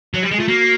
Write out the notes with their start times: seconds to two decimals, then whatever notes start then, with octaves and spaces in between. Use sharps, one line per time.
0.14 F#3
0.23 G3
0.31 G#3
0.38 A3 F4
0.48 A#3 F#4